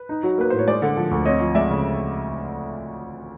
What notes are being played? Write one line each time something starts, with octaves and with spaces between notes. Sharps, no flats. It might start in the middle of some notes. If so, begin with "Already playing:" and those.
Already playing: B4
D#4
F#3
A#3 B4
A2 C5
C#5
G#3 C5 D5
D3
F3
D2
C4 C#5 D#5
F3
G#3 D5 E5
C#3